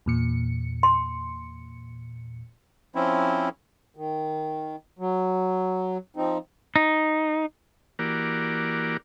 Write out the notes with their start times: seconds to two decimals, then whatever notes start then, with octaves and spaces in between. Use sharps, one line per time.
0.06 E2 A#2 C#7
0.83 C6
2.95 F3 C4 C#4 E4
3.97 D#3
4.99 F#3
6.17 F3 C4 D#4
6.76 D#4
7.99 E3 A#3 F#4 G4 A#4 D5